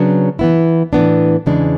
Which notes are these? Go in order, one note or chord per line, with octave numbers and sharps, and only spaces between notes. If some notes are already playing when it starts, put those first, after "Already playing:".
Already playing: C#3 F#3 B3 D4
E3 B3 E4
A2 E3 B3 D4
E2 C#3 E3 G#3 D4